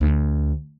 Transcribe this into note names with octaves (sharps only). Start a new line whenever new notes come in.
D2